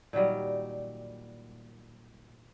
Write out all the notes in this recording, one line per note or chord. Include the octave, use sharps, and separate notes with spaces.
A#2 D#3 F#3 G3